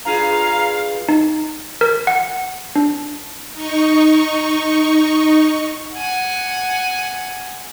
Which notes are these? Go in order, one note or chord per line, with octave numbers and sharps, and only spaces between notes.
G2 F4 G#4 F5 A#5
D#4
A#4
F#5
D4
D#4 C#6
F#5 G#5